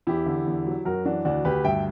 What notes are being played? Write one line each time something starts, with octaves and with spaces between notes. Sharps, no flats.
E2 E4 G4
D3
E2
F#3
F#2 F#4 A#4
E3 D4 F#4
D2 D4 F#4
D2 G4 B4
G2 E5 G5